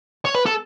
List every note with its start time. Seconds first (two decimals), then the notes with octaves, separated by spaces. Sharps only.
0.25 C#5
0.35 B4
0.46 A4